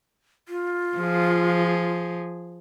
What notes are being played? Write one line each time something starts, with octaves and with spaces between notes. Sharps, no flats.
F4
F3 G#4